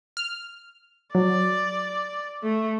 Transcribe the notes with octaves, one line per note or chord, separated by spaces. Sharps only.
F6
F#3 D5
A3